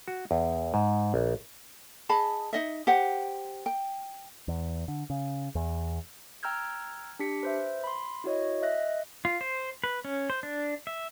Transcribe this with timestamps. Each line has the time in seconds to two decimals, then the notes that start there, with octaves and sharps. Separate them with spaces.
0.08 F#4
0.31 E2
0.74 G#2
1.14 A#1
2.09 G#4 D#5 A5 B5
2.53 D#4 D#5 E5
2.87 G4 C5 F#5
3.66 G5
4.48 E2
4.88 D3
5.10 C#3
5.55 E2
6.43 G5 A#5 E6 F6 G6 G#6
7.19 D4 G4 B6 C#7
7.43 B4 C5 E5
7.84 B5 C6
8.24 E4 F#4 C#5 D#5
8.62 D#5 E5 F#6 A#6
9.25 F4
9.41 C5
9.84 B4
10.05 C#4
10.30 C5
10.43 D4
10.87 E5